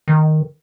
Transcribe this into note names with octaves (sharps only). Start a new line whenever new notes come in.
D#3